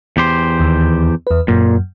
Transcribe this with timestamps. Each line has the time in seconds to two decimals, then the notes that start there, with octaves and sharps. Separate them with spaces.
0.17 E2 G4 C5
0.60 D#2 D#3
1.27 E2 B4
1.48 F#2 A#2